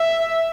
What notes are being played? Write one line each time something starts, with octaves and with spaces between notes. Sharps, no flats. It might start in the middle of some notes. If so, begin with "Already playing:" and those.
Already playing: E5